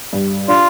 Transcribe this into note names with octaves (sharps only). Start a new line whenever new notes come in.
G2
D4 F4